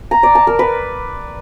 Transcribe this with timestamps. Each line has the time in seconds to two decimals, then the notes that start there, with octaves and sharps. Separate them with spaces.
0.11 A#5
0.23 D5
0.35 A5
0.47 A#4
0.59 B4